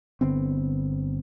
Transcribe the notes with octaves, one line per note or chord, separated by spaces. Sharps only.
G1 D3 B3 C4